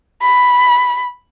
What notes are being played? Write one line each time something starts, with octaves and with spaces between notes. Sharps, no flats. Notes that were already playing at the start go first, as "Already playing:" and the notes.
B5